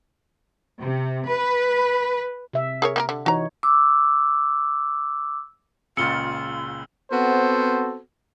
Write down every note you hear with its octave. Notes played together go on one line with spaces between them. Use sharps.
C3
B4
C3 E5
G#4 A#4 C#5
A#3 G4 A#4
D3
E3 D#4 F#4 C#5 A#5
D6 E6
C#2 A#2 C#3 F4 E6 C#7 G7
B3 C4 F#4 A4 C5